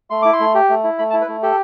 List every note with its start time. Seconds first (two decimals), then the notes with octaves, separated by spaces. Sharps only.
0.10 A3 C6
0.22 E4 D6
0.33 C6
0.40 A3
0.55 G4
0.69 A3
0.84 E4
0.98 A3 B5
1.10 A5
1.14 E4
1.21 B4
1.28 A3
1.43 G4 A4